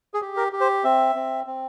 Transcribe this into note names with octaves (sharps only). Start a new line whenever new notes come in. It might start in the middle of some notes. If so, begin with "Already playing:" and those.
G#4
G4
A#4
G4
C5
C4 E5
C4
C4